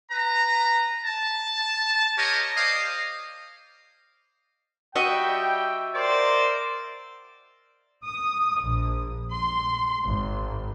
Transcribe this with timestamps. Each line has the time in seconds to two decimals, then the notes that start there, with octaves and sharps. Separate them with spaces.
0.11 B4 A#5
1.05 A5
2.17 G4 A#4 C#5 D#5
2.56 C5 D5 D#5 F5
4.96 G3 F#4 D#5 E5 G5
5.95 A#4 C5 D5
8.04 D#6
8.61 A#1
9.31 C6
10.05 G#1